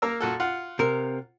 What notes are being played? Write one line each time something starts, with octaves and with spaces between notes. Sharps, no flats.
A#3 A#4 E6
A#2 F#4 A4
F4 F#5
C3 A#4